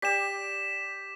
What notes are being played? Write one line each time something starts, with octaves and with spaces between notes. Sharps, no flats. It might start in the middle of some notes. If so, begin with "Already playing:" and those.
G4 D5 B6 E7